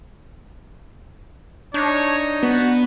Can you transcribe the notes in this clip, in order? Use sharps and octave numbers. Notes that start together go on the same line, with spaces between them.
D4 D#4 C#5
B3 F#4